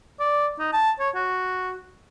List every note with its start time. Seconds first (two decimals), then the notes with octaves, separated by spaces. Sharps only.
0.20 D5
0.59 D#4
0.73 A5
1.00 C#5
1.15 F#4